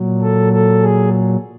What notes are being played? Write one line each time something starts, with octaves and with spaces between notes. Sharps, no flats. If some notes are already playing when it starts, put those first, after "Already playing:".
Already playing: A#2 F#3
A4
A4
G#4